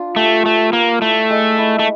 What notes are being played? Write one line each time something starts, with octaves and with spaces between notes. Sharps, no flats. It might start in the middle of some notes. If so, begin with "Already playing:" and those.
Already playing: D4 F4
A3 G4
A3 B4
A#3 B4
A3 E4
G#3
E4
A3